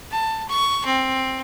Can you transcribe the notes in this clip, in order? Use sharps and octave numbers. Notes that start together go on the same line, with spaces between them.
A5
C#6
C4